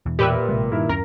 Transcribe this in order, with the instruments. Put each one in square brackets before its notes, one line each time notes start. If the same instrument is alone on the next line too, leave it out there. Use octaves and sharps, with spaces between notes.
[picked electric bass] E2 B2 E3
[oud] A#2 [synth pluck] G4 B4 E5
[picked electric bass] A1 C3 G#3
[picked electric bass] G2 [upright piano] D#3 E4 A#4
[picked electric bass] D1 F#2 C#4 [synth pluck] A#4 [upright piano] A#6